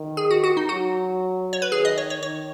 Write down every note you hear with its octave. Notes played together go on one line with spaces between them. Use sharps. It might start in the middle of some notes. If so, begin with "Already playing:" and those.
Already playing: D#3
G#4
F#4
F#4
D#4
F#3 F#4
C#5
B4
D#3 G#4
D#5
C#5
C#5
D#3 C#5